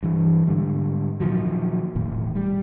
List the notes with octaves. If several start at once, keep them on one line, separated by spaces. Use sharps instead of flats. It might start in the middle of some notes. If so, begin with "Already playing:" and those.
G2 E3
G#2 D3 G3
A#2 D#3 F3 F#3
E1 A2 D#3
G3